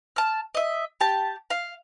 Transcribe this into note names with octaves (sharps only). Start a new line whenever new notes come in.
A5 F6
D#5 E5
G4 A5
F5